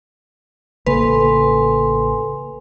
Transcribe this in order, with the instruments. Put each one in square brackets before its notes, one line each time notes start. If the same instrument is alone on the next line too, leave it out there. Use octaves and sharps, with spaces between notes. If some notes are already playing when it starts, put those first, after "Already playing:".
[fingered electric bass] A1 C#3 A#3 [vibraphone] A4 G#5 C6 [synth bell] B4